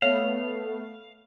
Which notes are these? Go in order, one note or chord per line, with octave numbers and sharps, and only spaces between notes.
A3 B3 C#5 F5